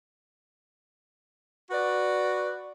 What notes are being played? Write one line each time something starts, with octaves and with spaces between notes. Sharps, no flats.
F#4 B4 D5